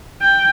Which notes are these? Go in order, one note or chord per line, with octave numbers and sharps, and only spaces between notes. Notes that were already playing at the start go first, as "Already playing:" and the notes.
G5